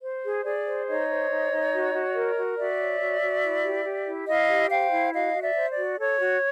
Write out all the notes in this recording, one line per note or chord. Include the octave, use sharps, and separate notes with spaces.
C5
G#4
G#4 D5
C5
D#4 C#5 D#5
C5
D#4
D#4
F#4
F#4
A#4
F#4
F#4 D5 E5
C#5
F#4
F#4
E4
G4
G4
E4
E4 D#5 F5
G4
C5 F5 G5
E4
F#4 D#5 F5
F#4
D5 E5
C5
D5
F#4
A4 C#5
F#4